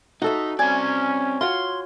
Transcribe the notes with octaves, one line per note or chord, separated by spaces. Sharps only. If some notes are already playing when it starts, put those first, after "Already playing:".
D#4 F#4 A4 E5
C4 C#4 D5 G#5
F4 F#4 C#5 C6